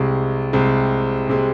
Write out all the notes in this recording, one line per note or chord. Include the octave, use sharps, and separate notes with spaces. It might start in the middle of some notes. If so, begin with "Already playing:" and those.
Already playing: C2 C3 G#3
C2 C3 G#3
C2 C3 G#3